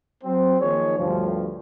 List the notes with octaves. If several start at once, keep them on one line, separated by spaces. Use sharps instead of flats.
F#3 C4
D#3 F3 A#3 D#4 G#4 C#5
D2 G2 F3